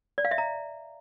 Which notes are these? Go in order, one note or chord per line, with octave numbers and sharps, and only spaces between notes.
D5
F5
E5
A#5